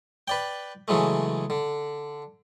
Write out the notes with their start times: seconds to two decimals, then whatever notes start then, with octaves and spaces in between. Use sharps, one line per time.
0.28 B4 D5 G5
0.88 C#3 E3 F#3 G#3 A3
1.50 D3